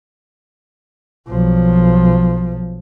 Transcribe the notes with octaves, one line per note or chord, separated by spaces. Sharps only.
B1 F3